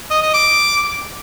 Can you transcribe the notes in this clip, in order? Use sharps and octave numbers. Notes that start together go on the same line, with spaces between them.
D#5
D#5
D6